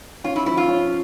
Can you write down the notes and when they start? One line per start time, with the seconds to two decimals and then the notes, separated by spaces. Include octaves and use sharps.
0.24 C#4 F4
0.36 E4
0.46 F3 E4
0.57 F4
0.68 C#4